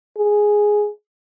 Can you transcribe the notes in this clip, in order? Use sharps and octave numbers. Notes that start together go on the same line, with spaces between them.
G#4